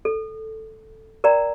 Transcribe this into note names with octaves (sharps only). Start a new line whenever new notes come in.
A4
A#4 D5 G5 A#5